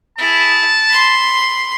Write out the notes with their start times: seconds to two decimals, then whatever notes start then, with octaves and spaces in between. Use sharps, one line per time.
0.18 E4 G#4 A5
0.89 B5 C6